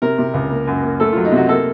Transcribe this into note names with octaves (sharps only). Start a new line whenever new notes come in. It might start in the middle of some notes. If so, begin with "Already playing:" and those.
C3 A#4
C3
C#2
A#3
F#2
A#3
A3 A4
F#3 F4
D#4
C3 F#4
A#3 A4